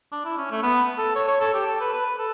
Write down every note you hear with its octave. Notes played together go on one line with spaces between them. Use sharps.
D4
E4
C#4
A3
B3
A4
C#5
C#5
A4
G4
A4
B4
B4
B4
A4